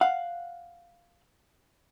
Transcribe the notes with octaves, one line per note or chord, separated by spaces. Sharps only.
F5 F#5